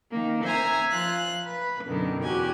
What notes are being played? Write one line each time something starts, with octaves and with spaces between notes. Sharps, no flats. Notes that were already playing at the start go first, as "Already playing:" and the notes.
D#3 A#3
C5 E5 G#5 A#5 G#6
F3 F4 F#6
B4
F#2 B2 D3 D#3
E2 F#4 G4 G#5